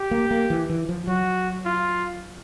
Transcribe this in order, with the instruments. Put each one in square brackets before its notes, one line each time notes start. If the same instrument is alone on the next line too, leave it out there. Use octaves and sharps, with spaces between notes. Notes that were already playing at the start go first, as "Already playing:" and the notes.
Already playing: [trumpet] G4
[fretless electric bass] A#3
A#3
E3
E3
F3
[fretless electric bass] F#3 [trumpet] F#4
[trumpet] F4